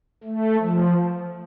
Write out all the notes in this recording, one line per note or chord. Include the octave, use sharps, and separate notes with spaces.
A3
F3